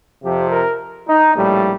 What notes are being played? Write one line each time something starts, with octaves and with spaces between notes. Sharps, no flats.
F2 C3 F3 G4
A#4
D#4
A#1 A2 G3